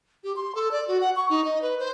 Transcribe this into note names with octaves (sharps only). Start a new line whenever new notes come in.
G4
C6
A4
D5
F#4
F#5
C#6
D#4
D#5
B4
C5